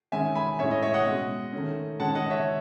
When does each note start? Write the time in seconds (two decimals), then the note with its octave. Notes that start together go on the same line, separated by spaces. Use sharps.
0.12 D#3 G#3 C#4 E5 G#5
0.35 G#5 B5
0.59 A2 G#3 C#4 C#5 E5
0.71 D#5
0.83 C#5 E5
0.94 D#5 F#5
1.06 B2 G#3 C#4
1.53 D#3 A3 C#4
1.99 D#3 G#3 C#4 F#5 A5
2.15 D#5 F#5
2.30 C#5 E5